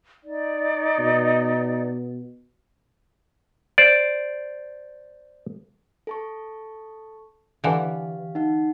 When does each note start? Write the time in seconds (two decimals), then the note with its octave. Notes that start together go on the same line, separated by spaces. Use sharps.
0.24 D#4 D5
0.99 B2
3.78 C5 D5
6.07 A4 A5 C#6
7.64 D3 E3 G4 F5
8.35 D#4 F#5